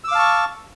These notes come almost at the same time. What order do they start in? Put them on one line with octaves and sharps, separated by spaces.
E6 D6 F5 A5 C#6